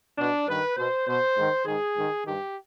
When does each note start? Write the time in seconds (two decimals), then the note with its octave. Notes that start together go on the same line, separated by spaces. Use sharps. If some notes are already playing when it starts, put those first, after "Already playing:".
0.18 B2 D4
0.48 G2 D#3 B4
0.77 B2 C5
1.07 B2 C5
1.36 G#2 D#3
1.65 G#2 D#3 G#4
1.95 G#2 D#3
2.23 G2 D#3 G4